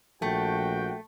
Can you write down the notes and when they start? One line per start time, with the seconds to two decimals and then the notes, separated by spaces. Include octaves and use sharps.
0.22 A#1 A3 F#4 G5